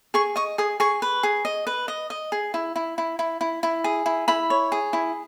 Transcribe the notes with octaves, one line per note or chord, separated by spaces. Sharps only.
G#4 C#6
D#5 C#6
G#4 D#6
G#4 C#6
B4
G#4
D#5
B4
D#5
D#5
G#4
E4
E4
E4
E4
E4
E4
G#4
E4
E4 B5
C#5
G#4
E4